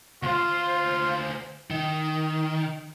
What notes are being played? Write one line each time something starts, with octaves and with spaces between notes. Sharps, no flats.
D2 F4 C5
D#3 D#5